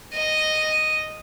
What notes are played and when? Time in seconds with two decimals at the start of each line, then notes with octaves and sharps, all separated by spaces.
0.14 D#5